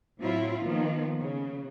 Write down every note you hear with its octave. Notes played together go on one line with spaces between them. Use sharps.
A2 F#3 C4 E4 F4
D#3 F3 A#3 B3
C#3